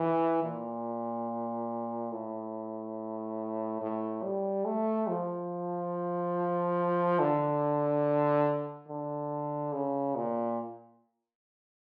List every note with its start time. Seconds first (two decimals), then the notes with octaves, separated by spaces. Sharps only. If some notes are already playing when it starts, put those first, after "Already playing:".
Already playing: E3
0.43 A#2
2.11 A2
3.82 A2
4.23 G3
4.65 A3
5.08 F3
7.20 D3
8.88 D3
9.73 C#3
10.16 A#2